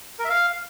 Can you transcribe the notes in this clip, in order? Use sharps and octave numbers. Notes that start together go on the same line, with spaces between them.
A#4
E5
F5